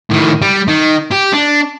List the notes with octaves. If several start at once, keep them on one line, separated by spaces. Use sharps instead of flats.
A2 D#3
G3
D#3
G4
D4